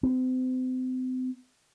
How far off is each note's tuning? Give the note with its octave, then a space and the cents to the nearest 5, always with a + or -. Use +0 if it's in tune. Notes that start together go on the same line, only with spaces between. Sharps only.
C4 -35